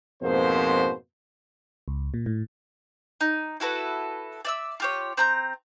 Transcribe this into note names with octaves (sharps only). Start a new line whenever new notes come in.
F2 G#2 B2 A#3 C5
C#2
A#2
A2
D#4
E4 F#4 A4 B4
D5 E5 E6
F4 G4 C#5
C4 A#5 G6